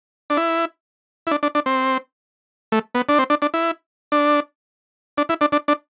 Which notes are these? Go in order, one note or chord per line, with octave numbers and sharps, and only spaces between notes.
D4
E4
E4
D4
D4
D4
C4
A3
B3
D4
C4
D4
D4
E4
D4
D4
E4
D4
D4
D4